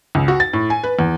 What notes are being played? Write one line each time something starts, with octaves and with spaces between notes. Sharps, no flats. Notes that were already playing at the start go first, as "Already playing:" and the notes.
C#2
F#4
A6
A2
G#5
B4
E2